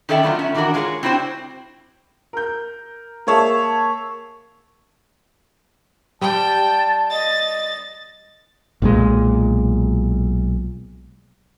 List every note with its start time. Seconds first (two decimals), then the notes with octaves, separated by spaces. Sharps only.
0.09 D#3 C#4 A4 D5 E5 G5
0.23 D#3 F#3 A3 B3 E4 F4
0.39 C#4 E5
0.54 D#3 E3 D4 F#4 A#4
0.74 G#3 F4 G#4 C5 C#5
1.03 C4 D4 E4 F#4 C5 G5
2.33 A#4 G6
3.27 A#3 G#4 C#5 E5 A5
6.21 G3 G5 A5
7.10 D#5 A6
8.82 B1 A#2 D3 G#3